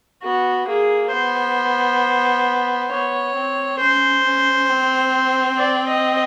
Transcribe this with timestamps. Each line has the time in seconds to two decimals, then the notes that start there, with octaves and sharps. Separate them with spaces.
0.24 B3 F#4
0.68 A#3 G#4
1.13 B3 C5
2.91 B3 C#5
3.35 C4
3.80 C#4 C5
4.25 C#4
4.70 C4
5.58 D5
5.88 D#5